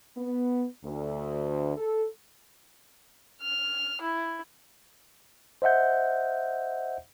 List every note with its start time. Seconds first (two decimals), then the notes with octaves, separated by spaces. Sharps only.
0.17 B3
0.85 D2
1.77 A4
3.42 F6
4.01 E4
5.62 C5 D#5 E5 F#5 G6